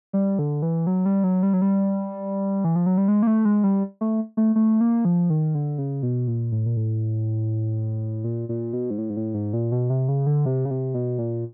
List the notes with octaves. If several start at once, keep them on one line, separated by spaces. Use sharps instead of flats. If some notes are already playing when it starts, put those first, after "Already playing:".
G3
D3
E3
F#3
G3
F#3
G3
F#3
G3
E3
F3
F#3
G3
G#3
A#3
A3
G#3
G3
A3
A3
A3
A#3
F3
D#3
D3
C#3
B2
A#2
A2
A#2
A2
A#2
A#2
B2
G#2
A2
G#2
A2
G#2
A#2
B2
C3
C#3
D3
C3
C#3
C3
B2
A#2